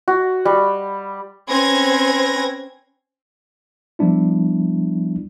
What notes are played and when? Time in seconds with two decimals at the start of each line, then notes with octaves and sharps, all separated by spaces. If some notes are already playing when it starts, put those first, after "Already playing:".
0.08 F#4
0.45 G3
1.49 C4 C#4 B4 G#6 A#6
3.99 F3 G3 B3 D4 E4